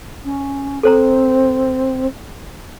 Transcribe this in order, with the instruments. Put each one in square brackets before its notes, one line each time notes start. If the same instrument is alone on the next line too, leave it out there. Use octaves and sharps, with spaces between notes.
[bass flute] C#4
[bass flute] C4 [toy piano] A4 C5 A#5